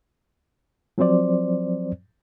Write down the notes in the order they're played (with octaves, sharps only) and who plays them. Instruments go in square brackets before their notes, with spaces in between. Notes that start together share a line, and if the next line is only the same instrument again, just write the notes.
[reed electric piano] F3 F#3 C4 C5 D5